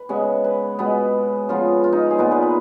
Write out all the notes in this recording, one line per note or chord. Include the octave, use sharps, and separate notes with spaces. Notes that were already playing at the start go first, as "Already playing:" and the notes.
Already playing: B4
C#3 G#3 B3 C#5
B4
B2 G#3 B3 B4
C#3 F3 B3 F4
F4
D#4
G#4
A#2 G#3 B3 A#4
B4
B4